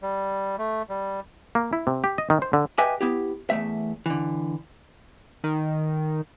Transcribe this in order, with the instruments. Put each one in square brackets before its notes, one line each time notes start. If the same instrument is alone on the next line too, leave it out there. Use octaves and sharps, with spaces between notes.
[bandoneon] G3
A3
G3
[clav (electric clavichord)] A#3
E4
C3
G4
D#5
D#3
C5
D3
[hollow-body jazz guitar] G4 B4 D#5 E5 G5 G#5
B3 E4 G4
E2 G2 A3 E5
D3 E3
[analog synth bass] D#3